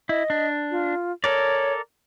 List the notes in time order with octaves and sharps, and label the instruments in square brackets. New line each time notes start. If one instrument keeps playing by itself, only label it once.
[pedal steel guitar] E4 [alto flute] D#5
[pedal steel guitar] D4
[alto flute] F4
[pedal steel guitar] A4 A#4 D5 [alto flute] C#5